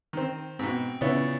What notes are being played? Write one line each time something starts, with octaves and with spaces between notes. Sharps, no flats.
D#3 C4
G#2 B2 C4
A#2 C#3 B3 C#4 E4 A6